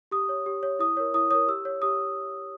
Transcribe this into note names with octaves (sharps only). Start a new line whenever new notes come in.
G4 D#6
C#5
G4
C#5
E4 D#6
A#4 C#5
E4 D#6
A#4 C#5 D#6
G4 E6
C#5
G4 D#6